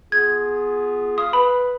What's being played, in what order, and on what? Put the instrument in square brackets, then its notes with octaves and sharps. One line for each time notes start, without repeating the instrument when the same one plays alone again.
[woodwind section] B3 F4 G#4 [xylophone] G#6
[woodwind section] F5 C6 [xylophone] D#6
[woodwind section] B4 [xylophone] B5